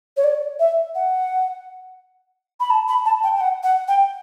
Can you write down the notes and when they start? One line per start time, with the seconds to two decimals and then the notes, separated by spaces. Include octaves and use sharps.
0.16 C#5
0.23 D5
0.59 E5
0.95 F#5
2.60 B5
2.70 A5
2.88 B5
3.05 A5
3.23 G5
3.35 G5
3.40 F#5
3.63 F#5
3.87 G5